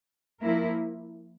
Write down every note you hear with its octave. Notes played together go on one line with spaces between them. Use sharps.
F3 A#3 E4 A#4